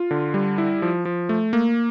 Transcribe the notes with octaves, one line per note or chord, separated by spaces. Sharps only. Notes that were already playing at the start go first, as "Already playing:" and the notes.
Already playing: F4
D3
G3
E4
F3
F3
A3
A#3